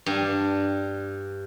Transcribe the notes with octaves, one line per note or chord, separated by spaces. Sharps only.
G2